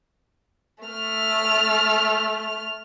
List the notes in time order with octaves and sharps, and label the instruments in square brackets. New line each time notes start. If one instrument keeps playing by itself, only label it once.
[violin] A3 F6